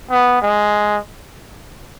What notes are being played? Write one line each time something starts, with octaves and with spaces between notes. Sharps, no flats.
B3
G#3